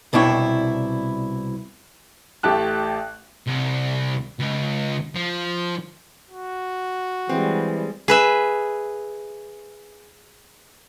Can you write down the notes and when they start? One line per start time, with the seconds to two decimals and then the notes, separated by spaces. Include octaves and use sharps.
0.13 C2 B2 D4 E4 C#5 G5
2.43 A1 A3 G4 A5 F#6
3.47 C2
4.39 C#2
5.16 F3
6.30 F#4
7.29 E3 G3 G#3 C4
8.08 G#4 B4 E5